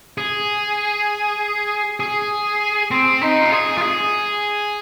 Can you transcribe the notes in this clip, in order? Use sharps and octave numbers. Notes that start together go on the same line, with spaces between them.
G#4
G#4
C4
D#4
F4
G#4
F4
G#4